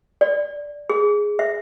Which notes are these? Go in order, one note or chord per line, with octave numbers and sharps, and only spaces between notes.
D5
G#4
E5